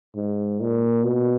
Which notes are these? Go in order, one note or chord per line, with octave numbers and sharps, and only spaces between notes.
G#2
A#2
B2